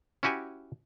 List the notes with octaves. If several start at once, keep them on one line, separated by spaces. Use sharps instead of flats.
C#4 E4 F#4 G4 G#5